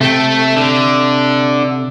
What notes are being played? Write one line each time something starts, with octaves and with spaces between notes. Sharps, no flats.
C3 A3 G5
D3